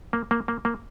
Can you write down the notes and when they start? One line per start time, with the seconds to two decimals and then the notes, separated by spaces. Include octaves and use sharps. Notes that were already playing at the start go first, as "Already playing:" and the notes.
0.13 A#3
0.31 A#3
0.48 A#3
0.65 A#3